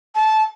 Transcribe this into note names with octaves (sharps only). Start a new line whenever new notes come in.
A5